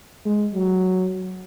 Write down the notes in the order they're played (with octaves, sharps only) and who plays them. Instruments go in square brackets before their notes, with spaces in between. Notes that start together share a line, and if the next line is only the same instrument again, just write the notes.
[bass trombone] G#3
F#3